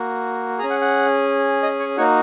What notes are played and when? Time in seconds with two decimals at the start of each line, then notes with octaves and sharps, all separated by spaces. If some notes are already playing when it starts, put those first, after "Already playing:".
Already playing: A#3 F#4
0.58 G#4 A#5
0.63 C#4
0.70 F#5
0.81 F#5
1.63 D#5
1.79 C#5
1.97 A#3 D#4 F#4 C#5